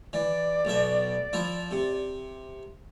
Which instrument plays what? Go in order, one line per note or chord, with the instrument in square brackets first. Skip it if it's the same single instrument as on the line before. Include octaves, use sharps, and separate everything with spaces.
[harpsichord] E3 [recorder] D5
[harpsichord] B1 B2 E5
F3 E4
C3